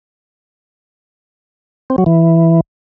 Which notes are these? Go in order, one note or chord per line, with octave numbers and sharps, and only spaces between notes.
C4
F#3
E3